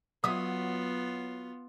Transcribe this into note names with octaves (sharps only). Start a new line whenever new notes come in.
F#3 B3 F4 E5 D#6